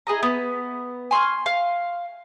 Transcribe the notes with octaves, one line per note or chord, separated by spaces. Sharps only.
E4 G#4 D#5 A#5
B3 B5
G#5 C6 C#6 F6
F5